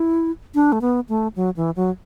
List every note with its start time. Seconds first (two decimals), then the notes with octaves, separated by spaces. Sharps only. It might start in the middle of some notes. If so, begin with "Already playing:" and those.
Already playing: E4
0.55 D4
0.72 A3
0.81 B3
1.09 A3
1.36 F#3
1.56 E3
1.76 F#3